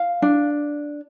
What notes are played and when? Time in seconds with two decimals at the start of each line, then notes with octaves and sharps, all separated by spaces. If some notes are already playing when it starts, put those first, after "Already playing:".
Already playing: F5
0.22 D4